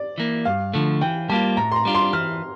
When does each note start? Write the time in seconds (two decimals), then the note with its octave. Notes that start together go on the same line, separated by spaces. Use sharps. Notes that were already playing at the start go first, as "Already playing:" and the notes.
Already playing: D5
0.18 E3 A#3
0.45 G2 F5
0.74 D3 F3 A3
1.01 E3 G5
1.29 G3 A#3 F4 A5
1.57 A2 A#5
1.72 C6
1.76 A#5
1.85 G3 D4 F4
1.95 C6
2.13 E3 F6